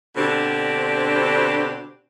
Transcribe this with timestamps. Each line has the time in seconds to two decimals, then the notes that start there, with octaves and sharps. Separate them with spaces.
0.16 B2 D3 C4 D4 G4